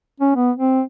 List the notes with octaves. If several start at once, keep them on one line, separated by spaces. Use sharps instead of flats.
C#4
B3
C4